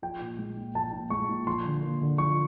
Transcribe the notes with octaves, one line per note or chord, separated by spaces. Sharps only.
F3 G5
A#2
G#3
A#2
F3 A5
A#2
G#3 C#6
A#2
F3 C6
D3
A#3
D3
F3 C#6